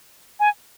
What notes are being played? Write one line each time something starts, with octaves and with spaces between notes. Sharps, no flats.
G#5